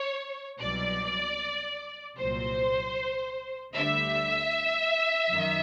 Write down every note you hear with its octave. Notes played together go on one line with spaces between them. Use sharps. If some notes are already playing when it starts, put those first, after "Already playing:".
Already playing: C#5
C2 B2 F#3 D5
C2 A#2 F#3 C5
D2 D3 G3 E5
F#2 D#3